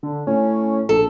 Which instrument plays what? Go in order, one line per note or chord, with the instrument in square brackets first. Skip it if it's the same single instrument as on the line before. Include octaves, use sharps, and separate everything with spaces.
[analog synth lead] D3
[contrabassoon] A2 [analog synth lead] C#4
[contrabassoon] A#1 [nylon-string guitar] A4